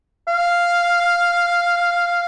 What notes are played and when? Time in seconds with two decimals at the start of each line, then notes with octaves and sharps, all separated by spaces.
0.28 F5